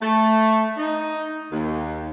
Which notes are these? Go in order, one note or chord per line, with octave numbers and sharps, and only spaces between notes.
A3
D#4
D#2